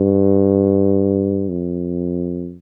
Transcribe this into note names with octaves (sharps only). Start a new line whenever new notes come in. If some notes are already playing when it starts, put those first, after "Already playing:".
Already playing: G2
F2